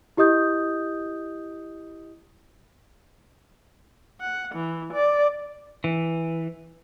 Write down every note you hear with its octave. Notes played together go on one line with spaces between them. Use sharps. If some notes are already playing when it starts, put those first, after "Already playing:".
E4 G4 D#5 D#6 G6
F#5
E3
D5
E3